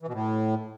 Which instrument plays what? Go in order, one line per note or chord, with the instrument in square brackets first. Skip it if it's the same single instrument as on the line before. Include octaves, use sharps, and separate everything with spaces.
[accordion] E3
B2
A2